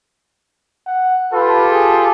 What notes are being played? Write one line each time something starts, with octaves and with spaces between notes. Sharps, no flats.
F#5
F4 G4 A4 B4
G#4